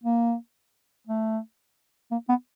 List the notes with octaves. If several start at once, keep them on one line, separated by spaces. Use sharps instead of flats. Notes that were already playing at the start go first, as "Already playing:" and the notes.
A#3
A3
A#3
B3